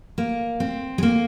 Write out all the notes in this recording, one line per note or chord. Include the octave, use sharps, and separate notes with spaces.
A#3
C4
G#3
A#3